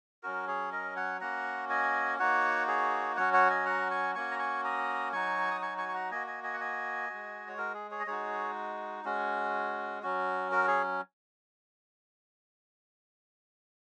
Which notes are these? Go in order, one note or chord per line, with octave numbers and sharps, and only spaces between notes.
F#3 C#4 F#4 A#4
G#4 C#5
A#4 D#5
C#5 F#5
A#3 C#4 F#4 F#5 A#5
D#5 G#5
A#3 D#4 F#4 C#5 F#5
G#4 C#5
F#3 C#4 F#4 C#5 F#5
C#5 F#5
D#5 G#5
F#5 A#5
G#5 C#6
A#3 C#4 F#4 G#5 C#6
A#5
G#5 C#6
A#5 D#6
F#3 D#4 F#4 G#5 C#6
D#6
G#5 C#6
G#5 C#6
C#6
F#5 A#5
A#3 F#4 D#5 G#5
D#5 G#5
D#5 G#5
F#5
D#5 G#5
G#3 F#4
C#5
F#4 A#4
G#4
G#4 C#5
D#5
G#3 D#4 F#4 G#4 C#5
G#3 C#4 F#4
F#3 C#4 F#4
F#4 A#4
G#4 C#5